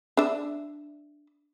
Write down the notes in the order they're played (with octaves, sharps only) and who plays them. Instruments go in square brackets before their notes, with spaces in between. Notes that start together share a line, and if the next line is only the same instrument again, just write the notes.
[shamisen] D4 E5